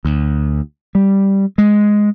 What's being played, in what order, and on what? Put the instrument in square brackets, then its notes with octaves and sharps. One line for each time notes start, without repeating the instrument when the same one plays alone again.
[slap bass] D2
G3
G#3